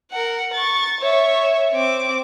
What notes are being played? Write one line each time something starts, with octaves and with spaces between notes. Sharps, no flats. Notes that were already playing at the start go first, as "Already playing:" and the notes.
A#4 F#5
C#6 A6
C#5 E5
C4 D6